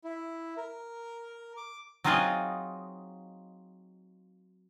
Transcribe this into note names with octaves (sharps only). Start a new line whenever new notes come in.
E4
A#4
D6
F#3 C4 D#4 F4 G#4 D#5